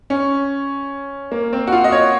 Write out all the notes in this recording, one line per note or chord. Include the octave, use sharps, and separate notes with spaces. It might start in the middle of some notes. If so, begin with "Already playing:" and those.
C#4
A#3
C4
F#4
F4
D#5
C#5